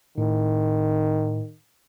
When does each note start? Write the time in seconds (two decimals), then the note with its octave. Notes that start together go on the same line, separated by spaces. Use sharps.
0.18 A2 D#3